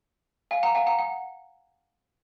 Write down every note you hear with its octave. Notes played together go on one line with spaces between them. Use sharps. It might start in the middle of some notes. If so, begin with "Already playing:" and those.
F5 G#5
F#5 A#5
F5 G#5
F#5 A#5
F#5